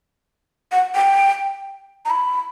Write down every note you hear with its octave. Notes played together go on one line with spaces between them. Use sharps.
F#5
G5
A#5
B5